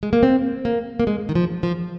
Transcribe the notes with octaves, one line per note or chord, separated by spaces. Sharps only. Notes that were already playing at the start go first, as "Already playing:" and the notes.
G#3
A#3
C4
A#3
A#3
G#3
D#3
F3
F3